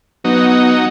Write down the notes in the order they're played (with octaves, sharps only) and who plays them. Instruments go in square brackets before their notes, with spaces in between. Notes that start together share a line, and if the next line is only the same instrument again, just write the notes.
[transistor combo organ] F#3 D#4 [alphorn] B3